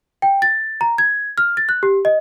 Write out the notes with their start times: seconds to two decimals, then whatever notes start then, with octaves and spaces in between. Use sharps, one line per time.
0.22 G5
0.42 A6
0.81 A#5
0.98 G#6
1.38 F6
1.57 A6
1.69 F#6
1.83 G4
2.05 D#5